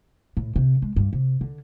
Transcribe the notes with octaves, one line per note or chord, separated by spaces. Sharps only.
A2
C3
G#3
G2
C3
D3